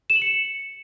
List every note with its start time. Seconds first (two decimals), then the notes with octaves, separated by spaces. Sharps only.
0.10 E7
0.16 F#7
0.22 C#7